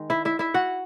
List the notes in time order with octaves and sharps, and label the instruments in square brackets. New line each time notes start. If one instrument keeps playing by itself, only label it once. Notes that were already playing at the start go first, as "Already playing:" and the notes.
Already playing: [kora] D#3 G#3
E4 E5
E4 E5
E4 E5
F#4 F#5